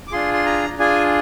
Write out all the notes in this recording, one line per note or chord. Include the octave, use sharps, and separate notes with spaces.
D6
D4 F4 G#4 C6
C6
A#5
D4 F4 G#4 G#5